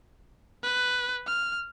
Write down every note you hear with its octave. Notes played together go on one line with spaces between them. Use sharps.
B4
F6